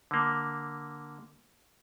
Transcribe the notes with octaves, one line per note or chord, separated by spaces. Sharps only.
D3 A#3